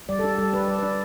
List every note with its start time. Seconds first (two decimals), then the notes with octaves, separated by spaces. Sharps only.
0.09 G3 D5
0.19 A4
0.24 D4
0.38 G3 A4
0.53 D4 B4
0.68 G3 D5
0.79 B4
0.83 D4 D5